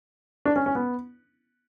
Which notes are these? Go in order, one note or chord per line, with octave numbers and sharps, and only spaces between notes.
D4
C#4
C#4
B3